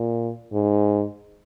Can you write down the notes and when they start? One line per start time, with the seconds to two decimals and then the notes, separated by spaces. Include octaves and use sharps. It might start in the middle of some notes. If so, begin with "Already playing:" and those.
Already playing: A#2
0.53 G#2